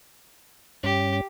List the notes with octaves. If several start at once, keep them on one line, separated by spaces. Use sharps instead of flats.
G2 C#4 G4